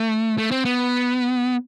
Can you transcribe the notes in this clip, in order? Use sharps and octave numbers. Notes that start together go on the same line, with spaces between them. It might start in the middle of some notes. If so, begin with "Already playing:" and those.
Already playing: A3
A3
C4
B3